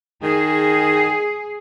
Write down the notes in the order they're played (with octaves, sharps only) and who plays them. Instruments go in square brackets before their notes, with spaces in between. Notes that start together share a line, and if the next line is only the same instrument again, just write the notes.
[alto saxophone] D#3 [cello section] G#4